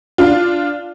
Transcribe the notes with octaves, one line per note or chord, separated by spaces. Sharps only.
D4 F4